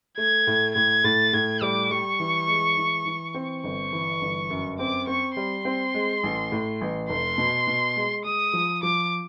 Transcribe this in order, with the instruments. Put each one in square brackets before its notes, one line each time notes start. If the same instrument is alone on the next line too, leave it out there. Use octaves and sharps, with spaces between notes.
[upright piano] A3 [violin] G#6
[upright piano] A2
[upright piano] A2 [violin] G#6
[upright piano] A2 [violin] A6
[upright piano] A2 [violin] G#6
[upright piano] G3 [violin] D6
[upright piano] G3 [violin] C#6
[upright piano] E3
G#3
E3
E3
C4
[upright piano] G1 [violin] C#6
[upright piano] E3
G1
F#2
[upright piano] C4 [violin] D6
[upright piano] C4 [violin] C#6
[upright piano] G3 [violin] C6
[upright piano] C4
G#3
A1
A2
A1
[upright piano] F1 [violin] C6
[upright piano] B2
B2
G#3
[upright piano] G#3 [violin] D#6
[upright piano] F3
[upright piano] F3 [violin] D6